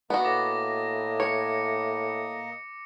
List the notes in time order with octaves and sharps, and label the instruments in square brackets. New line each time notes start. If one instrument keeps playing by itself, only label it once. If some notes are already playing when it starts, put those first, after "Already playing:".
[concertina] A#3 D#5 [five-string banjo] B3 F#4 [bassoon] D4
[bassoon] A2 [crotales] D6 A#6
[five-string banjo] C#5 [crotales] C#7